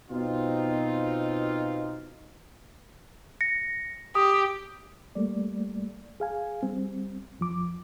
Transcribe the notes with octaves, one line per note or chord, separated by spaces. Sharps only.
B2 C4 D#4 F4
A#6 C#7
G4 D#6
G3 A3 A#3 D5
G#4 F5 G#5
G3 C4
F2 F3 D6